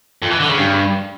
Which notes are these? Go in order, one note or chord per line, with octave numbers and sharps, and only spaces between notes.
F2
E3
D3
C#3
G2